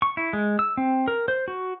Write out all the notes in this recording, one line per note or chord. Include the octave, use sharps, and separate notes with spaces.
C#6
E4
G#3
E6
C4
A#4
C5
F#4